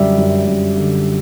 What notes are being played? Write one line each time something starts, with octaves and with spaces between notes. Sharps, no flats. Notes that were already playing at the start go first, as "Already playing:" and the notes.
Already playing: F#2 D3 G3 D5 E5
F#2
F#2
D3